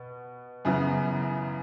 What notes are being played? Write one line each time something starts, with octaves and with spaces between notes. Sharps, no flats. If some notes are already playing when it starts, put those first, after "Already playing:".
Already playing: B2
F#2 C#3 E3 B3